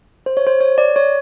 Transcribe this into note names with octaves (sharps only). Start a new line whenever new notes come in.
C5
C#5
C5
C#5
D5
C#5